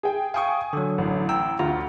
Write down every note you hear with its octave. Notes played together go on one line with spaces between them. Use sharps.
G#4 G5
F5 G5 G#5 C#6 D#6
D3 F#3
A1
G5 A#5 E6
D2 F4 A#5